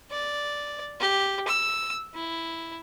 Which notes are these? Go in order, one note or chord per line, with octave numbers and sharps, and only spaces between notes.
D5
G4
E6
E4